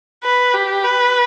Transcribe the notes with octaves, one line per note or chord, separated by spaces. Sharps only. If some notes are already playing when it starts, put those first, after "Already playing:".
B4
G4
B4